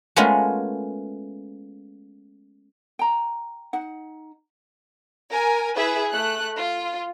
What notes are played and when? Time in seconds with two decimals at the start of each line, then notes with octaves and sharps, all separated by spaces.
0.16 G#3 A3 B3 C#4 F4 A#4
2.99 G5 A#5
3.73 D#4 F#5
5.31 A#4 G#5
5.75 E4 G#4 B4 E5
6.12 A3 F#6
6.58 F4